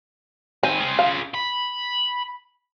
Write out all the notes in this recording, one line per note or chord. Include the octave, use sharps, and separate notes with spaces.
D#3 C4 G#5
F4 G#4
F5
B5